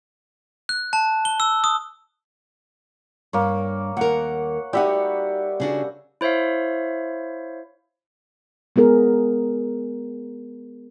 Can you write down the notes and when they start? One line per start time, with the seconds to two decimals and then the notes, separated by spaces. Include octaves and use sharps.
0.69 F#6
0.93 A5
1.25 G7
1.40 E6
1.64 D#6
3.33 G2 A#3 C#5
3.97 D#2 A#4 F#5
4.73 G3 D#4 F#4 G4 E5 F#5
5.60 C#3 D4 F#4
6.21 E4 C5 C#5 E5 F5
8.76 G#3 B3 G#4 A#4